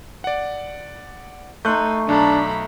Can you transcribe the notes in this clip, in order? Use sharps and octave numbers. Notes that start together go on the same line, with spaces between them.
D5 F#5
A3 D#4 C6 F#6 G6
B1 D4 A4 A#5 B5